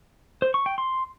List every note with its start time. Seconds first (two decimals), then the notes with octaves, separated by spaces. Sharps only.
0.42 C5
0.54 C#6
0.66 G5
0.78 C6